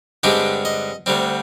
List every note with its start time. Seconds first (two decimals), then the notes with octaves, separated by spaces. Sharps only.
0.23 G2 D3 G#3 C4 G4
0.65 D#5
1.06 D2 D3 G3 C4